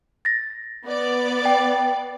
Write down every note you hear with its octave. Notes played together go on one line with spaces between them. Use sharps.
A6 A#6
B3 D5
G5